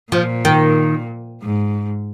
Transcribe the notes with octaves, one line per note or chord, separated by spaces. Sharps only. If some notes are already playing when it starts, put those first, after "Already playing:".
A#2 F3
D#3
G#2